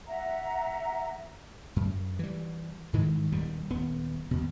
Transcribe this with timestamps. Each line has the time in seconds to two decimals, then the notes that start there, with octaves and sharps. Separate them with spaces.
0.08 E5 F#5 A#5
1.76 F#2
2.19 E3 G3
2.93 G#2 D#3 E3 G#3
3.32 D#1 D#2 B2 G3
3.70 D#1 B3
4.31 D#2 B2